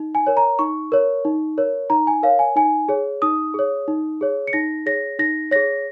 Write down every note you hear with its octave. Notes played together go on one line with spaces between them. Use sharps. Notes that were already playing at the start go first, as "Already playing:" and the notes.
Already playing: D#4
G#5
A#4 C#5
A#5
D#4 C#6
A#4 C#5
D#4
A#4 C#5
D#4 A#5
G#5
A#4 C#5 F5
G#5
D#4 G#5
G#4 C#5
D#4 D#6
G#4 C#5
D#4
G#4 C#5
C#7
D#4 A#6
G#4 C#5 A#6
D#4 A#6
G#4 C#5 A#6